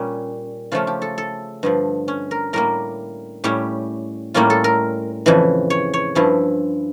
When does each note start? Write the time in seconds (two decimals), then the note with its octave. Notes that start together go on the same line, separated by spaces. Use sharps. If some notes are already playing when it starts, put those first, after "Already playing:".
Already playing: A#2 G3 C#4
0.72 C#3 F3 A3 C#4 F4
0.87 G4
1.02 A4
1.18 A4
1.63 G2 D3 F3
2.08 C#4
2.31 A#4
2.53 A2 G3 A#3 A#4
3.44 A2 G3 C#4 G4
4.34 A2 G3 A#3 C#4 F4
4.50 A4
4.64 A#4
5.26 F2 C#3 E3
5.70 C#5
5.94 C#5
6.15 G2 F3 C#4 E4